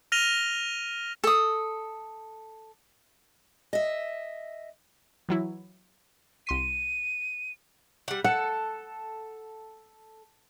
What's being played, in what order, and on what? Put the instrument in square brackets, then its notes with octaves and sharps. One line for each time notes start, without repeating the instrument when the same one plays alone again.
[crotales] F6 A#6 D#7 F7 G7
[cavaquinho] A4 D#6
[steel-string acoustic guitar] D#5 E5
[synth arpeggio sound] E3 F#3 E4
[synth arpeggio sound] C2 C6 B6 [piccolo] D#7
[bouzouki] G3 F#5
[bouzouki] A4 [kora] F#5